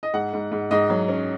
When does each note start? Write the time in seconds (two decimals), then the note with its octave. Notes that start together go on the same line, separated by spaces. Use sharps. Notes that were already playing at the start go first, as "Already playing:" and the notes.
0.03 D#5
0.14 G#2 F#5
0.33 G#2
0.52 G#2
0.71 G#2 D#5
0.90 F#3
1.08 C#4